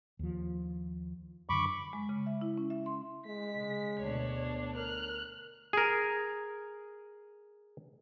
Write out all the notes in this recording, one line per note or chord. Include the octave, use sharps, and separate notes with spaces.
D#2 F3
F#2 D3 B5 C#6 D6
G#3
C#3
E5
E4
C#4
E5
C6
G#3 B6
C#3
D2 B2 D4 C#5
A#4 F6 F#6
G#4 A#4